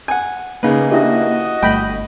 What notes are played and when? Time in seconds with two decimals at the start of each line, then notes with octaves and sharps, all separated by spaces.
0.08 F#5 G#5
0.63 C#3 A#3 D#4 B4
0.91 D4 E4 F#4 G4 D#5
1.63 G1 G3 A3 G5 B5